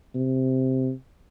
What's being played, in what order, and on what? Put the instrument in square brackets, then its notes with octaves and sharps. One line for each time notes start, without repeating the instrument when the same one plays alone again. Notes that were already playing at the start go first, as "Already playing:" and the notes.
[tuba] C3